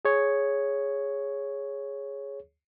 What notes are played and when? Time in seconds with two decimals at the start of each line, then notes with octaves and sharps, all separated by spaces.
0.05 G#4 C#5